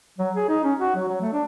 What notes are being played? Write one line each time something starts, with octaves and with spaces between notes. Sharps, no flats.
F#3
G#4
D#4
C#4
F#4
F#3
F#3
A3
D4